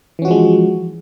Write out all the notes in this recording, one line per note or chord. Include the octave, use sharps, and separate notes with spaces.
E3 F3 G#3 C#4 F#4